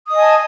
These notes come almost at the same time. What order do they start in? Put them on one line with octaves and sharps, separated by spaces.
D#6 D#5 G#5 A5